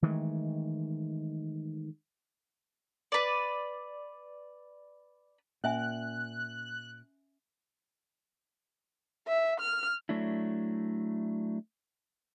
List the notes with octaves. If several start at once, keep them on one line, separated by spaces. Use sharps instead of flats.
D#3 E3 G#3 A3
B4 D5
A#2 C#4 E5 G#5 F#6
E5
F6
F#3 A3 D4 E4